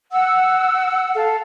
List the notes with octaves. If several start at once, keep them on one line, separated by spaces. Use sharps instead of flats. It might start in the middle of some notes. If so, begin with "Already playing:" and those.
F#5 E6
A4 F5